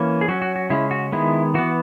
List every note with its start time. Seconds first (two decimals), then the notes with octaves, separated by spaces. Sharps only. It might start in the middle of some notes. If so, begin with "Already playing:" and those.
Already playing: E3 A#3 C#4
0.21 G#4
0.28 F#3 C#4 F#4
0.42 F#4
0.56 F#4
0.70 C#3 G#3 C#4 E4
0.91 F#4
1.12 D#3 G#3 B3 E4
1.54 E3 B3 F#4